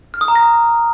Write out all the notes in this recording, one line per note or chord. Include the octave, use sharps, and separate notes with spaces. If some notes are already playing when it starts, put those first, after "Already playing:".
F6
D#6
A#5
A#6